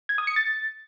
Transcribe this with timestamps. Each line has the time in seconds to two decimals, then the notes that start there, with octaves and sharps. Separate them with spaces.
0.09 G#6
0.18 D#6
0.27 C#7
0.36 A6